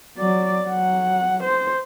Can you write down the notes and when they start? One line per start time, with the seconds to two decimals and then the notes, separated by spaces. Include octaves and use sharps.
0.18 F#3 D5
0.68 F#3 F#5
1.43 C5